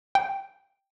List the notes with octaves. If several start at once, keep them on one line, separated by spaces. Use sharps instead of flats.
G5